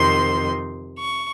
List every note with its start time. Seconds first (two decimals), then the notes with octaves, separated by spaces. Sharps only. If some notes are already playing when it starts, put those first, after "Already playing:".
Already playing: F2 C3 D#3 C6
0.99 C#6